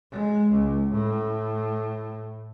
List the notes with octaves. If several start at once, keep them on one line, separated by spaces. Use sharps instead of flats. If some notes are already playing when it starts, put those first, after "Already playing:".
G#3
C#2
A2